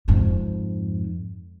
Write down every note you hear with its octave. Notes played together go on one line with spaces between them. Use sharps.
F2 G#2